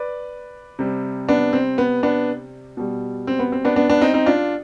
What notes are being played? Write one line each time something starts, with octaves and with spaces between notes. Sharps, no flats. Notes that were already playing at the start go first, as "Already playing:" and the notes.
Already playing: B4 D5
C3 G3
B3 D4
C4
B3
B3 D4
B2 G3
C4
B3
C4
B3 D4
B3 D4
B3 D4
C4 D#4
C4 D#4
D4 F4